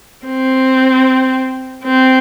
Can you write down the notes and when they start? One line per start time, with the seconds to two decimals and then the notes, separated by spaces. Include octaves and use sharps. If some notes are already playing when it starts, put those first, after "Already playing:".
0.27 C4
1.84 C4